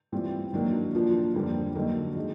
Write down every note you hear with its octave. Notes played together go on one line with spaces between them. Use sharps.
A2 E3 G3 C4 F4
D#3 F#3 A#3 D4
A#2 F3 A#3 D4
F2 D3 G3 A#3
D3 F#3 A#3 D#4
D#3 G#3